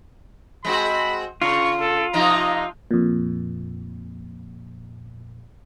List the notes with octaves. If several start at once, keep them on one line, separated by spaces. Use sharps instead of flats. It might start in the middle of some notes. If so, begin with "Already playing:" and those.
G#3 C4 F#4 B5
C#3 F4 C#6
A4
C3 F3 D#4 A#5
F2 A#2